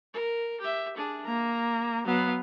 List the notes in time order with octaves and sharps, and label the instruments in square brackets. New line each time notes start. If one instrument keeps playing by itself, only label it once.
[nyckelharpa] A#4
G4 E5
D4 G#4
[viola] A#3 [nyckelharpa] A#5
[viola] F#3 B3 [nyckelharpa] F5